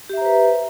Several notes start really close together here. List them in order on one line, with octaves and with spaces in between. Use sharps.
G4 E5 A#5 C5 B4